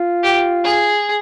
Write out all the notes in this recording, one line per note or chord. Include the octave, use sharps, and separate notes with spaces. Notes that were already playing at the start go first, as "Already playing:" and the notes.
Already playing: F4
G4
G#4